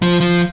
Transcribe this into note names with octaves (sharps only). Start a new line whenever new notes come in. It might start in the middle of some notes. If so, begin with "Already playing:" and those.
F3
F3